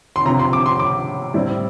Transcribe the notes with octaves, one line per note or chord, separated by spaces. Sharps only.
C6
C3 F3 C4 A#5
C6
D6
C6
D6
A2 G3 C4 E4